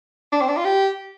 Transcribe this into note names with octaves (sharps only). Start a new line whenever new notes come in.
D4
C4
D4
F4
G4